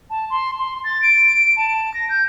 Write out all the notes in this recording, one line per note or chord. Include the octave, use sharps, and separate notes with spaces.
A5
C6
C6
A6
D7
A5
A#6
G6